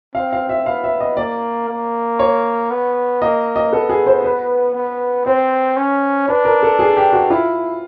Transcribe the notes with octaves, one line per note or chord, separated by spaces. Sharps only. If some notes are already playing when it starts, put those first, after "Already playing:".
C4 F5
F5
E5
B3 F5
E5
D#5
A#3 D5
A#3
C#5
B3
A#3 D#5
D#5
B3 A4
G#4
C5
B4
B3
C4 C5
C#4
D4 B4
A#4
A4
G#4
G4
F#4
E4 F4